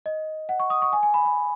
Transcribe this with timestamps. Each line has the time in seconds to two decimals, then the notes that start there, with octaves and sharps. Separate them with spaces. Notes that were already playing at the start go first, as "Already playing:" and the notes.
0.06 D#5
0.49 F#5
0.60 C#6
0.70 D#6
0.82 C#6
0.93 G#5
1.03 G#5
1.14 B5
1.25 B5